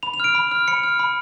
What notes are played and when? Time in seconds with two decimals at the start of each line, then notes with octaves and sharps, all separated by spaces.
0.03 B5 F7
0.14 F7
0.20 F6 D7
0.35 B5
0.51 F6
0.68 B5 C#7
0.83 F6
0.99 B5